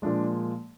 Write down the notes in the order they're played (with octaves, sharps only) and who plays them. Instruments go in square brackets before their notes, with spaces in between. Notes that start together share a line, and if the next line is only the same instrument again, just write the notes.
[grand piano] A#2 F3 G#3 D4